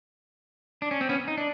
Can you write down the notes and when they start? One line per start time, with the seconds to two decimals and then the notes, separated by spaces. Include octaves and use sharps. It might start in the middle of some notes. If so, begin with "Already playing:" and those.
0.82 D4
0.91 C#4
1.01 C4
1.09 B3 C#4
1.28 D#4
1.37 D4